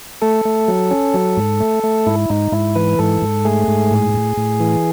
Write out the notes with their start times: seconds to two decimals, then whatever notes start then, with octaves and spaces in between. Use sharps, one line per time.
0.22 A3 A4
0.45 A3
0.68 F#3
0.91 C#4
1.14 F#3
1.37 G#2
1.60 A3
1.84 A3
2.06 G#2 E4
2.30 G#2 D#4
2.52 G#2 E4
2.75 E3 B4
2.99 G#2 A4
3.22 G#2
3.45 A3 G#4
3.68 G#2
3.91 A2
4.14 A2
4.37 A2
4.60 E3